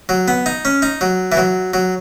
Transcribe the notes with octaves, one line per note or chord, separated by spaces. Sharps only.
F#3
B3
D#4
C#4
D#4
F#3
E3
F#3
F#3